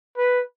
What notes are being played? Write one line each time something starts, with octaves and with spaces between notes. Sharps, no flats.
B4